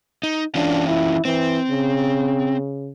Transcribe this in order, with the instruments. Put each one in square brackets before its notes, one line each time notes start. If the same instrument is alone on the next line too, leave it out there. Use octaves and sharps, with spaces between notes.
[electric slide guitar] D#4
[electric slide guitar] E3 C#4 F4 [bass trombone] D4
[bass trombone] E4
[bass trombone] E3 [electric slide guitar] C4
[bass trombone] C#3